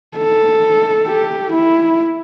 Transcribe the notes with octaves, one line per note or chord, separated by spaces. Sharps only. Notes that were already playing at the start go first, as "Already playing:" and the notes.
A4
G4
E4